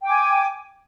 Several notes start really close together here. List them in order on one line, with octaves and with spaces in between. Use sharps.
G5 D6 G#5